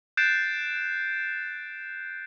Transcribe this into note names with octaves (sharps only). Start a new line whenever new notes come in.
F#6 G6 A6 C7 D7 E7